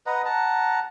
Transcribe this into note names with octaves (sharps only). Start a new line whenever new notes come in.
B4 D#5 F#5 A#5
F#5 A5 A#5